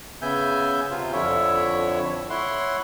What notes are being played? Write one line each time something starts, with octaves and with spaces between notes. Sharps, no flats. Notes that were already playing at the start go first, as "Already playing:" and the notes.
C#3 B3 E5 G#5 G6
C3 F4
F2 D3 E4 C#5 E5
E4 C#5 F#5 C6